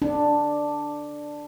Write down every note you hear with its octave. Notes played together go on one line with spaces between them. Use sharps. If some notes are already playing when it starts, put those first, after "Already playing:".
D4